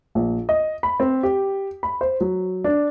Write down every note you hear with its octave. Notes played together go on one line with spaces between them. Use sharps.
A#1
D#5
B5
C4
G4
B5
C5
F#3
D4